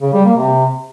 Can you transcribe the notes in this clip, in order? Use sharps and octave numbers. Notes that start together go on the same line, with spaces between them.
C#3
G3
A#3
C3